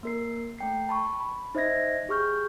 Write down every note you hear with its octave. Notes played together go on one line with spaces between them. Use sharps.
A#3 A#4 C7
A3 G5 C7
A5 B5 C#6
B5
D#4 C5 D#5 E5 G#6 A#6
G4 G#4 C#6 F6 G6